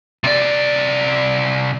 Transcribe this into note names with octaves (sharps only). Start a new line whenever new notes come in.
C3 D5